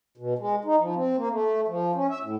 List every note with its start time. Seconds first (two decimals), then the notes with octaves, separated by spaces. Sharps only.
0.17 B2
0.39 G#3
0.65 D#4
0.79 F3
0.95 C4
1.17 A#3
1.31 A3
1.68 F3
1.95 C#4
2.10 E5
2.23 A2